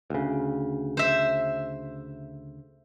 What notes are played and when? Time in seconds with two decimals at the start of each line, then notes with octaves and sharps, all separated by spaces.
0.10 D2 C#3
0.97 C5 E5